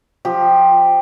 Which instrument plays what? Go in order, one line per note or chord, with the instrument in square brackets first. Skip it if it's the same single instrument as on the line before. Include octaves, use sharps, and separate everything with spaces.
[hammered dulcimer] F3 G4